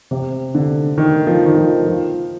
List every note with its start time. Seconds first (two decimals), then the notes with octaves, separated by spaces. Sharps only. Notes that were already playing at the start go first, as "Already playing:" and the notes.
0.11 C3
0.55 D3
0.98 D#3
1.27 F3
1.46 D#3
1.56 F3
1.85 F3